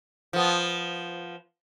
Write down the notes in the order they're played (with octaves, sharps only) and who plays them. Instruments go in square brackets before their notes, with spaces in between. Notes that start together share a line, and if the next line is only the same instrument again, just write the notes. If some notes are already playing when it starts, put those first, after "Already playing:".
[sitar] F3 B3